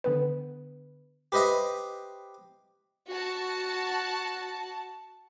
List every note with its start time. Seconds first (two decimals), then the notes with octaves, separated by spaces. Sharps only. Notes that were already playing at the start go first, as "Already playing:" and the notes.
0.04 D3 B3 B4
1.32 G4 B4 C5 D#5 E5
3.09 F#4 A5